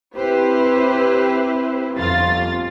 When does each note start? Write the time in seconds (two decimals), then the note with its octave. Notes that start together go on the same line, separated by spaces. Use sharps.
0.16 C4 E4 G4 B4 C5
1.96 G1 F2 F4 A6